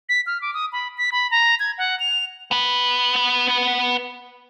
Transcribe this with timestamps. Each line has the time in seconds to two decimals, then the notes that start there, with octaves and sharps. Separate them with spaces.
0.09 B6
0.27 F6
0.42 D6
0.54 D#6
0.73 B5
0.98 B6
1.12 B5
1.31 A#5
1.60 G#6
1.78 F#5
2.00 F7
2.51 B3 B4